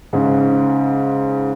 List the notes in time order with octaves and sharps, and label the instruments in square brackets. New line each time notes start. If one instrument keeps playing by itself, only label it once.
[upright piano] G#2 C#3